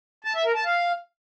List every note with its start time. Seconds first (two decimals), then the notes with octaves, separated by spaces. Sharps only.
0.25 A5
0.35 E5
0.45 A#4
0.55 A5
0.65 F5